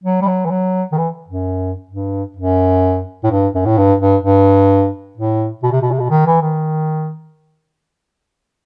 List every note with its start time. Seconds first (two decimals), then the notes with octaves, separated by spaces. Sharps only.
0.04 F#3
0.22 G3
0.27 F#3
0.45 E3
0.51 F#3
0.92 D#3
0.98 E3
1.28 F#2
1.91 G2
2.37 F#2
3.24 A2
3.31 G2
3.54 F#2
3.66 A2
3.78 G2
4.00 G2
4.24 G2
5.17 A2
5.63 B2
5.72 C3
5.82 B2
5.92 C3
5.99 B2
6.11 D#3
6.27 E3
6.42 D#3